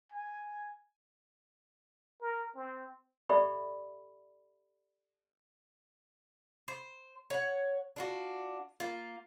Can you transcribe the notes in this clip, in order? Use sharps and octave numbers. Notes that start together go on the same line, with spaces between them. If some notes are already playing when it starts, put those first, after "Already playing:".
G#5
A#4
C4
G4 A4 D5 E5 B5 C#6
C5
C#5 F#5
D4 F4 F#4
A#3 F4